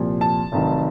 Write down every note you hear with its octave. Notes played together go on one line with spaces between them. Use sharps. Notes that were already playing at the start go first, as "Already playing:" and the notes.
Already playing: C2 A#2 F3
A5
F1 F2 D#3 F#3